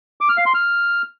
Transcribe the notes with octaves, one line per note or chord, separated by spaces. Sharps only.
D6
F6
F5
C6
F6